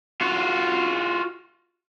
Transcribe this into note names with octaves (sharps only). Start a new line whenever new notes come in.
F4 F#4